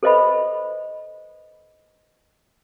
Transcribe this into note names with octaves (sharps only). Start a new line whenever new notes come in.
A4 B4 C5 D#5 E5 B5